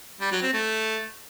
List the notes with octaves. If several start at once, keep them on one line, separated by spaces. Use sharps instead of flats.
G3
F#3
C4
A3